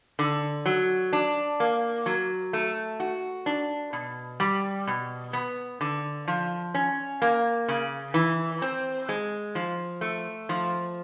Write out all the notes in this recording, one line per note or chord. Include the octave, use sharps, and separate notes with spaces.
D3
F#3
D4
A#3
F#3
A3
F#4
D4
B2
G3
B2
B3
D3
F3
C#4
A#3
C#3
E3
C4
G#3
F3
A3
F3